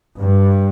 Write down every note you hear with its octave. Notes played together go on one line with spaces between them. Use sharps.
G2